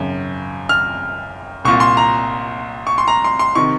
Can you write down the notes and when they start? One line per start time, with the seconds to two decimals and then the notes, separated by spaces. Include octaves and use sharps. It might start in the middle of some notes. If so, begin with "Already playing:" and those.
Already playing: G#1 F#2 C#3
0.69 F6
1.65 C2 A#2 C#6
1.80 C6
1.97 A#5
2.87 C#6
2.98 C6
3.08 A#5
3.24 C6
3.39 C6
3.55 C3 D#3 C#6